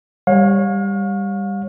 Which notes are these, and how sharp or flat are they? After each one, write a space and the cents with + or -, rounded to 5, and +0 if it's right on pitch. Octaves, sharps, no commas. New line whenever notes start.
G3 +15 C#5 -10 F5 +35